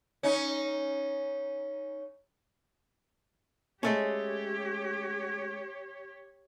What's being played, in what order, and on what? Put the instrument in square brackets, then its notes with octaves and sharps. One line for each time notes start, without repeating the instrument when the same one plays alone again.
[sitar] C#4 D#4
[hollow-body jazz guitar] G#3 A3 C#4 [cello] G4 C#5